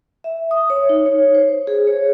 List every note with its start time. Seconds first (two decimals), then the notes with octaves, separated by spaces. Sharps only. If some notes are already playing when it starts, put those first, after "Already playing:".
0.24 E5
0.51 D#6
0.70 C#5
0.89 D#4
1.06 C#5
1.35 C5
1.67 G#4
1.87 C#5